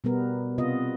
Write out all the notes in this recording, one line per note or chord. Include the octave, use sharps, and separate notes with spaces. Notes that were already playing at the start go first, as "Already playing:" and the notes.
B2 G3 B3 A#4
C3 B3 F4 D#5